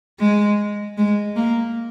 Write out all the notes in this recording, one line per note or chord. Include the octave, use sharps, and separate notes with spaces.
G#3
G#3
A#3